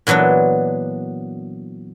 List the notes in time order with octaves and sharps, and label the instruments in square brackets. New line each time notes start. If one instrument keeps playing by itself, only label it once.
[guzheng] A#2 E3 F#3 B3 D4